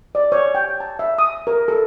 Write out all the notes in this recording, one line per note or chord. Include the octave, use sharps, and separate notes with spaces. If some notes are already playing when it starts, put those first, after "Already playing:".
D5
C#5
G5
A5
E5
D#6
A#4
A4